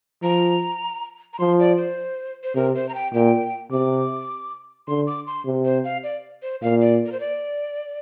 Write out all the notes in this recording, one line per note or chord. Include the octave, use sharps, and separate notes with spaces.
F3 A#5
A#5
F3 C6
D5
C5
C5
C3 A#4
C5
A#5
G5
A#2 G5
C3 D6
D3 C6
D6
C6
C3
C5
F5
D5
C5
A#2 F5
D5
A#4
C5
D5